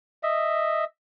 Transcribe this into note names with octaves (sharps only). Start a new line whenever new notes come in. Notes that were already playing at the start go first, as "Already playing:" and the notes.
D#5 E5